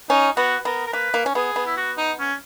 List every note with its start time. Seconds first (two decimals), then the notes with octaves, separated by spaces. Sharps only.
0.09 C#4 D#4
0.37 B3 F#4
0.65 B3 A#4
0.87 A#4
0.93 A#3 B4
1.14 A#3
1.26 C#4
1.35 B3 G#4
1.56 B3
1.66 E4
1.77 F#4
1.97 D#4
2.19 C#4